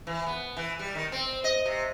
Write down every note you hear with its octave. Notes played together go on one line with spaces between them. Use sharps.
E3
B3
E3
G3
D#3
C4
D#5
C3